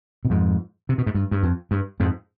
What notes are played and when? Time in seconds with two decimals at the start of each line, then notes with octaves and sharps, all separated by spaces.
0.25 B2
0.30 F2 G#2
0.89 C3
0.98 B2
1.06 G#2
1.15 G2
1.31 G2
1.43 F2
1.71 G2
2.00 F2 G#2